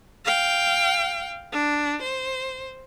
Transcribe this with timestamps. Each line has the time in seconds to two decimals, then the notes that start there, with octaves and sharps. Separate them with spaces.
0.25 F5 G5
1.52 D4
2.02 C5